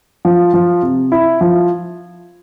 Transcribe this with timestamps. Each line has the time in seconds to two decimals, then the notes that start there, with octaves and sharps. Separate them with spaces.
0.25 F3
0.54 F3
0.82 C3
1.12 E4
1.41 F3